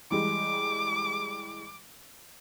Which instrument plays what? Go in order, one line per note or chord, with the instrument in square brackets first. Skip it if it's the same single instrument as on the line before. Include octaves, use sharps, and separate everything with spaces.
[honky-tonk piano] E3 G3 G#3 [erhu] D6